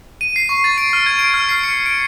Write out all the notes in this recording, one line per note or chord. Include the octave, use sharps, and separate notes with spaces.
D#7
C7
C#6
A6
D7
F6
G#6
D7
F6
C7
C#7
D7